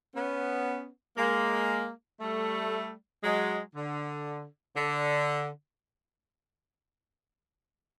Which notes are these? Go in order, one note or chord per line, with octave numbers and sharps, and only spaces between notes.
B3 C#4
G#3 A#3
G3 A3
F#3 G#3
D3
D3